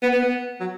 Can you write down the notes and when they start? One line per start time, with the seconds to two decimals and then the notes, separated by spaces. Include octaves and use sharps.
0.03 B3
0.13 B3
0.23 B3
0.60 F#3